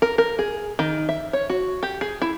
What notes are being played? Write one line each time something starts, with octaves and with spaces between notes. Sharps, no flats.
A#4
A#4
G#4
D#3
E5
C#5
F#4
G4
G#4
E4